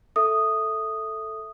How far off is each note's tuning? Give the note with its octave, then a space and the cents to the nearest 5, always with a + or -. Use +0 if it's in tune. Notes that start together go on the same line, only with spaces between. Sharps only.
A4 +0 E5 +0 D#6 -5